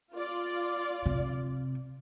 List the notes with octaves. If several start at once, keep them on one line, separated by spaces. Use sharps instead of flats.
F4 D5
C3